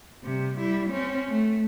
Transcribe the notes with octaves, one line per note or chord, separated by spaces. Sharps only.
C3 G3
G3 E4
C4 C#4
A3